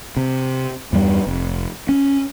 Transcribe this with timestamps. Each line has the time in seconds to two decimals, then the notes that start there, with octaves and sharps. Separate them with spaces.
0.17 C3
0.93 E2 G2 F#3 G3
1.27 F1
1.89 C#4